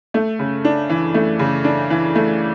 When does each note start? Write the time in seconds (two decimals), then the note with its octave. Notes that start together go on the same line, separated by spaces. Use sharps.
0.14 A3
0.39 C#3
0.65 D4
0.89 E3
1.14 A3
1.39 C#3
1.64 D4
1.90 E3
2.15 A3